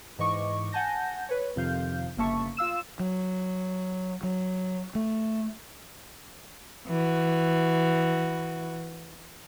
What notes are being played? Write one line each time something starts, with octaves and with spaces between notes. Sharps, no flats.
G#2 E3 D#5 C#6 D6
F#5 G#5 A5 G6 A#6
B4 C#5
F2 C3 D#3 F3 F5 G6
G1 C#3 A#3 E5 A5 C#6
F4 F5 E6 E7
F#3
F#3
A3
E3 F#4